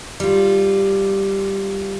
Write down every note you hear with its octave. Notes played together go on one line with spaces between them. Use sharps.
G3 F4